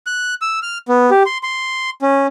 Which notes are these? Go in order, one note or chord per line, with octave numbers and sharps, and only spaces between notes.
F#6
E6
F6
B3
G4
C6
C6
C#4